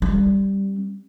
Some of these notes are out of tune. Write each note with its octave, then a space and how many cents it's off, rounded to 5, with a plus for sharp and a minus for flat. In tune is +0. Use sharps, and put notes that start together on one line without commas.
G3 +0 C4 +45